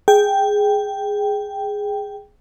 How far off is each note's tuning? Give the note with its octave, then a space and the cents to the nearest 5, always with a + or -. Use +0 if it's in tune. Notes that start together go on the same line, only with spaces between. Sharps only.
G#4 +0 G5 +0